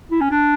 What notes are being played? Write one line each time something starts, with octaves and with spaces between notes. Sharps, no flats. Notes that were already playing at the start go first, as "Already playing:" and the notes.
E4
C#4
D4